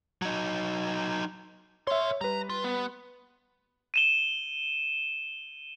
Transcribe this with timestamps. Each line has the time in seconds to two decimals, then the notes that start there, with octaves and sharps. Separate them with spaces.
0.22 F#3 D#4
1.87 A#4 C#5 E5 C6
2.21 G3 B4 A#5
2.50 F4
2.64 B3
3.94 D#7 E7 G7